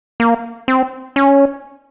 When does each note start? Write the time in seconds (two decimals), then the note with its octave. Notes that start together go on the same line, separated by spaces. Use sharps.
0.20 A#3
0.68 C4
1.16 C#4